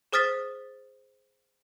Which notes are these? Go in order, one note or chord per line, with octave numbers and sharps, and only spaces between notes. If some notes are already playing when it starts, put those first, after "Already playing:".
G#4 C5 D#6 F6 A6 B6